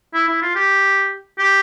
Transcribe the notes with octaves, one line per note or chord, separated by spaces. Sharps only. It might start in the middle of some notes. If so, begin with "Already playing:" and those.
E4
E4
F4
G4
G4